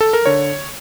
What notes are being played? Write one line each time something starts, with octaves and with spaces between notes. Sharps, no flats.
A4
A#4
D3 C#5